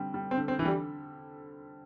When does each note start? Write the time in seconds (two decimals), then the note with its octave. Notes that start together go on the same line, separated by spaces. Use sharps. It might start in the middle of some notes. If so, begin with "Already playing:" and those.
Already playing: D3 G3 C4
0.14 G3
0.31 C4
0.37 D3
0.48 C4
0.59 D3 E3
0.65 G3